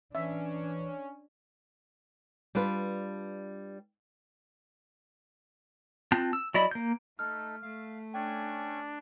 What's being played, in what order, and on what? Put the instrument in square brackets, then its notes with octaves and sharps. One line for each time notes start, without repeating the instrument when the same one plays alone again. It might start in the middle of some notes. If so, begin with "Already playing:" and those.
[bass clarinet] E3 [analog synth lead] C#4 [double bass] D4 [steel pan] E5
[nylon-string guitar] G3 D4 F4 B4
[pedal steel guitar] C4 F4 A5 F#6 G6
E6
F#3 E4 D5 D#5 B5
A#3 G6
[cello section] A3 [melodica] D#4 A4 [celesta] F6
[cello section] A3 [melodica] F5
[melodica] C#4 G#5 C#6 [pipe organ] D4 [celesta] G5